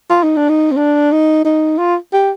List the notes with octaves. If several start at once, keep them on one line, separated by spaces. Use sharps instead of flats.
F4
D#4
D4
D#4
C4
D4
D#4
D#4
F4
G4